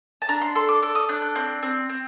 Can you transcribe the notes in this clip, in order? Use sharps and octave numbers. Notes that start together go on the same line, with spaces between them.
A5
D4 A#5
C6
A4 C6
D6
A4 D6
D#6
D4 F#6
F#6
C4 F#6
C4
C4